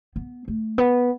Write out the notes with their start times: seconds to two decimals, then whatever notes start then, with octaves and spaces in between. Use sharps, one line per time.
0.16 B3
0.48 A3
0.78 B3